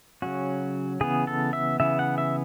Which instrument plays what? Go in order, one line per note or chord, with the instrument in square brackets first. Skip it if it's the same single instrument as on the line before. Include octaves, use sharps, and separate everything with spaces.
[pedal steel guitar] C#3 F#3 C#4 F#4
C#3 E3 B3 G#4
A4
E5
C#3 E3 B3 E5
F#5
E5